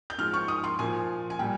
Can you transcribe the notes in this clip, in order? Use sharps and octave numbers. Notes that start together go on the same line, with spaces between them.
G6
G#2 F3 F6
C#6
D#6
C6
A#2 F3 G#5
G#5
A#2 G3 G5